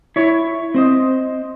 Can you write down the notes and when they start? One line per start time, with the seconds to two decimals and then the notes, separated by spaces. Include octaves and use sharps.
0.16 E4 C#5
0.74 C4 C5 D#5